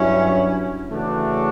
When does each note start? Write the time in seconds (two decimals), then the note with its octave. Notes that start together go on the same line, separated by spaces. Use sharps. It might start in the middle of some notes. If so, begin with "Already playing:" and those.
Already playing: G2 F#3 C#4 E4
0.90 C#3 E3 A3 D4 F#4